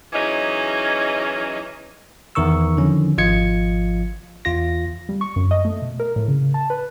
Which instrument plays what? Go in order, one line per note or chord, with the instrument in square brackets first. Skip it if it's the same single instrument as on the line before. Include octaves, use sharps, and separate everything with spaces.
[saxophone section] E3 F#3 C#4 D#4 G#4 D#5
[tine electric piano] E2 D#3 A#4 C#6 E6
D3 D#3 F3 C#4
G#1 F3 F4 D#5 G#6 C#7
E2 F4 A#6
[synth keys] G3
C#6
F#2
D#5
A3
B2
A#4
A2
C#3
A5
B4